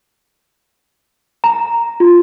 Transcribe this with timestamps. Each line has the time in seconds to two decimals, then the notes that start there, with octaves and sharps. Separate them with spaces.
1.44 A#5
2.00 F4